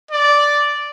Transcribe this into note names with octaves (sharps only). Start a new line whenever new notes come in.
D5